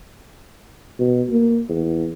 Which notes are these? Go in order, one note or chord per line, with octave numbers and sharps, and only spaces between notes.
B2
A#3
E2